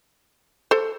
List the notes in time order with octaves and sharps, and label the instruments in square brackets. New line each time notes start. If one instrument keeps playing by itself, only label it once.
[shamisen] A4 C5